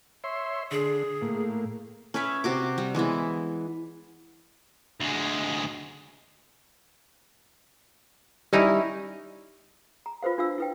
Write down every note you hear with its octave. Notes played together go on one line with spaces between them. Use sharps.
C#5 E5 C6
D3 G#4
A2 A#3
C#4 B4 C#5 E5
C3 F#4 D6
G3
E3 G#3 B3 E4
D2 G#3
G3 C#4 D#4 E4
A#5
F4 B4 C5 F5
D4 F4 F5 E6
E4 B4 G5